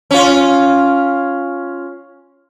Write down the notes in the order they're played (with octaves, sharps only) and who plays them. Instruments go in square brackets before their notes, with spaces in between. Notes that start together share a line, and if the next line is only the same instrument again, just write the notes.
[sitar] C#4 F4